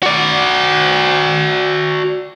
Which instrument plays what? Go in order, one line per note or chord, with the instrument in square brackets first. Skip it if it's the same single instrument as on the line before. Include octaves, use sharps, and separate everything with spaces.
[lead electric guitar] F#4 D5